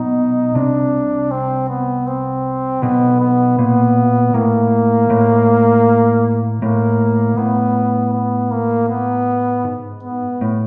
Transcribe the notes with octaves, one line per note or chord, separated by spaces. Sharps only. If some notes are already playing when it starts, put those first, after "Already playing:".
Already playing: B1 B2 D#4
C2 C3 D4
C4
B3
C4
B1 B2 B3
B3
A#2 B3
A2 A#3
A2
A2 A#3
A2 B3
B3
A#3
B3
G#2
B3
A2